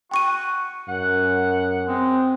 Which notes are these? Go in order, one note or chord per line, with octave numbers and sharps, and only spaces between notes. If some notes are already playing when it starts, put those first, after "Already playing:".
F#4 G5 C#6 D#7
F#2 F#5
G#3 C4